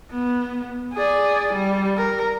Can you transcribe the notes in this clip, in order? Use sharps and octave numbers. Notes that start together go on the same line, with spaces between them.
B3
G#4 D5
G3
A#4